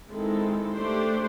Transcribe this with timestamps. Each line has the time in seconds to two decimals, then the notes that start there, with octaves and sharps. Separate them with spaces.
0.09 D#3 G#3 C4 E4 A4
0.74 A3 D4 G4 C5